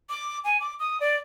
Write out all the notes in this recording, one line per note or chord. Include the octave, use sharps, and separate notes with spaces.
D6
G#5
D6
D#6
D5